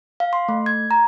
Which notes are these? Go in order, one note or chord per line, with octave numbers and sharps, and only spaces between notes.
F5
C6
A3
G#6
A#5